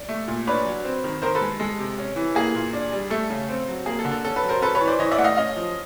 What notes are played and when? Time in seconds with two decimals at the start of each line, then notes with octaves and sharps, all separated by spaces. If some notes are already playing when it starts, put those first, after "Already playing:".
Already playing: D5
0.09 A3
0.28 A#2
0.47 D4 B4 C#5
0.65 F#3
0.84 C4
1.04 D#3
1.22 D#3 A#4 C5
1.35 A4 B4
1.41 G#3
1.60 G#3 A4
1.79 C3
1.98 C#4
2.16 E3
2.35 A#3 G#4
2.55 A#2
2.73 D4
2.93 G3
3.10 A3 A4
3.30 C#3
3.49 C4
3.68 F#3
3.86 A#3 G#4
3.99 A4
4.05 D3
4.11 A4
4.25 C#4 A4
4.36 A4 B4
4.44 F#3
4.49 A#4 C5
4.61 C#4 A4 B4
4.75 B4 C#5
4.81 E3
4.87 C5 D5
4.99 E3 C#5 D#5
5.12 D5 E5
5.18 A3 F#5
5.24 D#5 F5
5.37 C#4 D#5 F5
5.56 F3